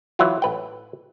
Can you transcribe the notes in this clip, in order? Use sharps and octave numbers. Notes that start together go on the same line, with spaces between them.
E3 F#3 E4 F4
A1 B4 G5